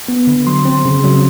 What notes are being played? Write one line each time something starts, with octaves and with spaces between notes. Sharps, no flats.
B3
D3
F#3 C6
C4
C#3
F#3